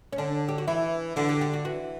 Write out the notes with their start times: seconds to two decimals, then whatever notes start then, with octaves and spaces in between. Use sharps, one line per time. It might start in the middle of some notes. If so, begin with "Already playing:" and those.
0.13 C#4
0.18 D3 D4
0.49 G4
0.58 F#4
0.67 E3 E4
1.16 D3 F#4
1.29 G4
1.41 G4
1.53 F#4
1.65 E3 F#4